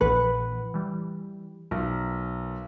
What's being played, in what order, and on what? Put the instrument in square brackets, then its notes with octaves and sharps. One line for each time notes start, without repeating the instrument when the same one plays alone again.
[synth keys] A#1 E3 F#5 [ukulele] B4
[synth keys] E3 G3
[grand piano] B1 [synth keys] A#4